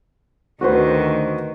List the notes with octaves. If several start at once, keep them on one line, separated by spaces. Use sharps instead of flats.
D2 D#3 F#4 B4 C5